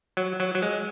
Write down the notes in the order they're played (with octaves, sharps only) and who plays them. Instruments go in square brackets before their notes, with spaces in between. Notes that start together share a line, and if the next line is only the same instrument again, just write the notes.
[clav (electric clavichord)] F#3
F#3
F#3
G#3